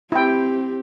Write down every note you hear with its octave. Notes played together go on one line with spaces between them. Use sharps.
C4 E4 G4 G5